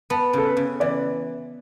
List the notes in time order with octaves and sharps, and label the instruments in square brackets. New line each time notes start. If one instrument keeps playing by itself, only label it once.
[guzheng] B3 [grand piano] A5
[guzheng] C#3 [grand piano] A4
[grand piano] B4
[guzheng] C#3
[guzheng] E3 [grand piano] D5